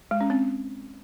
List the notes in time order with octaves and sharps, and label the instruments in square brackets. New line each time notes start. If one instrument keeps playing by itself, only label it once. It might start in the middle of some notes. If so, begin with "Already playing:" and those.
[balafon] G#3
C#4
C4